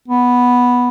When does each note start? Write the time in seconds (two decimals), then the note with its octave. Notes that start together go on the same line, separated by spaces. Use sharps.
0.08 B3